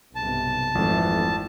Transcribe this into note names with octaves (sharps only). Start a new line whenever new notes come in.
B1 G2 C3 A5
G#1 F2 A#2 E3 A3